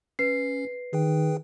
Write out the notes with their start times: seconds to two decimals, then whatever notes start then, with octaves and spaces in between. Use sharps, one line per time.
0.19 C#4 B4 C7
0.93 D#3 G#4 B4 G5